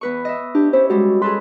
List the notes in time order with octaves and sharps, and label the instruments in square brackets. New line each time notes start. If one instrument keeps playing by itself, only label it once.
[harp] E2 B4 C#6
D#5 E5
[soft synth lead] D4 [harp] G4
[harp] C#4 E4 [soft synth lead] C5
[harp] G3 G#3 E4 [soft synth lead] F#4
[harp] G#4 A4 B4 [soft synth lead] C6